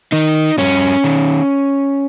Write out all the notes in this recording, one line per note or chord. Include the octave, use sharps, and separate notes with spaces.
D#3 D#4
G2 C#4
D#3